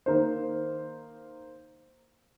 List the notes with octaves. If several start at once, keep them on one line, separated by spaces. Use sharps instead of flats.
D#3 A#3 D#4 C5